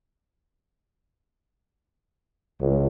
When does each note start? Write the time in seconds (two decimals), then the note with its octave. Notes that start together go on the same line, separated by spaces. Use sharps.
2.60 C#2